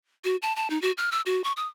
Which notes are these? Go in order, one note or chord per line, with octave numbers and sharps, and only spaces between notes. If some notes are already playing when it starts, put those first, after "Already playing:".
F#4
A5
A5
D#4
F#4
F6
E6
F#4
C#6
D#6